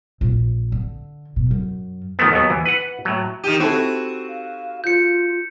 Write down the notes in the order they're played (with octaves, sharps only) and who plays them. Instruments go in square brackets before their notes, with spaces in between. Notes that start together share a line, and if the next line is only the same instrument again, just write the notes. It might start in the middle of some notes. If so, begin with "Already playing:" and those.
[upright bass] A#1
D3
B2
F#2
[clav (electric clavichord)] B2 D#3 F3 A3 B3
D#2 F#3 B3
E3
B4 F#5
A2 F#3
[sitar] D#3 G4 [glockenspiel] D#7 E7
[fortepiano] C4 E4 A4 [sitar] F#4
[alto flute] F5
[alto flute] F4 [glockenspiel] G6 C#7